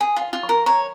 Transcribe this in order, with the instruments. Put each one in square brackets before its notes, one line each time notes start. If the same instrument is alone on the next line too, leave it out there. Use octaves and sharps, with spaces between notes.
[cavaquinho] G#4 [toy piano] G#5
[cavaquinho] F4
[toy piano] F5
[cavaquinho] F4
[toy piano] C#6
[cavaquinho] A#4
[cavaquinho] C#5 [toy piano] A#5